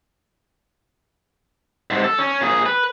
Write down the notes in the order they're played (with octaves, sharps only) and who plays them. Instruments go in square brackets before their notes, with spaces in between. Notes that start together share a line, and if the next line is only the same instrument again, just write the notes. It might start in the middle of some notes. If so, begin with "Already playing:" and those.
[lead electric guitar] G#2 C3
A4
C#4
A#2 G#4
B4